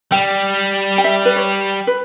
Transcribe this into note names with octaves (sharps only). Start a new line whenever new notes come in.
G3 G5
G5
E5
B4
C#5
B4